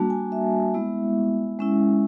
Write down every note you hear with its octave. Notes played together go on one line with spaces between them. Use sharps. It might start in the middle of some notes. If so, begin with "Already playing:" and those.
Already playing: G3 A#3 D4 F#4 A5
G#5
E5
G#3 B3 E4
G#3 C#4 E4